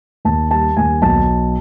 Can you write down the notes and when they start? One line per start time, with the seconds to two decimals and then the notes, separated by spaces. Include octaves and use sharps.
0.25 D#2 A5
0.51 G3 A5
0.77 D#2 G#5
1.02 B1 A5